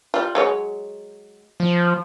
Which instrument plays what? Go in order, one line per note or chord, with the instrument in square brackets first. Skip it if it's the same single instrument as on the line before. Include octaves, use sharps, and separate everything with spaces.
[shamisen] G3 F4
F#3 G#3 C#5
[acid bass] F3